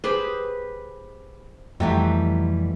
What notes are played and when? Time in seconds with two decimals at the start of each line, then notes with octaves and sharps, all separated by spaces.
0.04 G4 G#4 B4 C5 B5
1.80 F2 B2 E3 F#3 G3 A3 G4